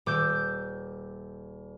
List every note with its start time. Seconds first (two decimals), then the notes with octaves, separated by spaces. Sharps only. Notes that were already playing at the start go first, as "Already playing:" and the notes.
0.06 D#1 D6 E6 G6 D7